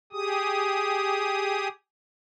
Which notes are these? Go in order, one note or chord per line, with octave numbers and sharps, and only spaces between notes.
G4 G#4 D#6